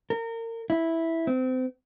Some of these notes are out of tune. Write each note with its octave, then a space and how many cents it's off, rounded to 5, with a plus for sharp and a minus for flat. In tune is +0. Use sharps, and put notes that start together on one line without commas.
A#4 -30
E4 -5
C4 -30